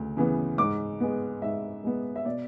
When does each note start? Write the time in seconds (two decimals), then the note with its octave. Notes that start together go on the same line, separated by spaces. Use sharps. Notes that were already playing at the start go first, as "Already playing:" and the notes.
Already playing: D2 C#3
0.17 C#3 E3 B3
0.58 G#2 D6
1.00 G#3 B3
1.42 G#2 E5
1.84 G#3 B3
2.16 E5
2.25 B2 D5